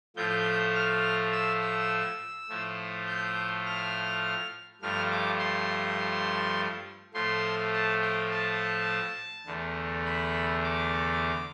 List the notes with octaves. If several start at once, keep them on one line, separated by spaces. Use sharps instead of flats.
A2 F3 A3 G6
F6
E6
E6
A2 F3 A3
G6
F6
G2 F3 A3 F6
D6
C6
A2 F3 A3 C6
A5
G5
A5
E2 D3 A3
B5
D6